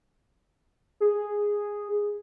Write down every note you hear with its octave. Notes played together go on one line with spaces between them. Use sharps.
G#4